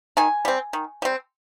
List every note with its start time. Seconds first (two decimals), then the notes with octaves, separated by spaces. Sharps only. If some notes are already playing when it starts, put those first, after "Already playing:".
0.17 D#3 G#5
0.45 G3 C4
0.73 D#3
1.02 G3 C4